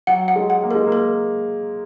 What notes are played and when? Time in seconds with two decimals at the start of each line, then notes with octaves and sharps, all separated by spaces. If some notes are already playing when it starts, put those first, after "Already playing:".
0.07 F#3 F#5
0.28 F#5
0.36 G#3
0.50 F#5
0.63 A#3
0.71 G#3 A#4
0.87 A#3
0.92 A#4